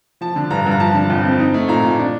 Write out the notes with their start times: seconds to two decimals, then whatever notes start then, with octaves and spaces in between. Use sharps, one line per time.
0.21 F3 A5
0.36 D3
0.50 G2 A#5
0.66 G2
0.71 A#5
0.80 F3 A5
0.95 D3
1.10 F2
1.24 C4
1.39 D#4
1.54 A3
1.68 A#2 A#5
1.83 A#2
1.99 D4